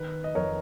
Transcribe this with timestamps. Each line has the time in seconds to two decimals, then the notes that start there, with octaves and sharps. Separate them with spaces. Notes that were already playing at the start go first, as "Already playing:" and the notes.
Already playing: D#3 B4
0.24 D#5
0.35 F2 A#4 C#5